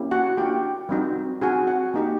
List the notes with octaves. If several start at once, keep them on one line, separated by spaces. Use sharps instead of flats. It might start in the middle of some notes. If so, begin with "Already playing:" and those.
Already playing: A#3 C#4 E4 G4
F#4 F#5
A#3 D4 F4 G4 G5
G3 C4 D#4 F#4
C4 D#4 F#4 G#4 G#5
F#4 F#5
A#3 D#4 G4